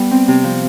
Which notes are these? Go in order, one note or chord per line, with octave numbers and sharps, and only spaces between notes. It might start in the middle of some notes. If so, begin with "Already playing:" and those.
Already playing: G3 B3
C4
C3
F3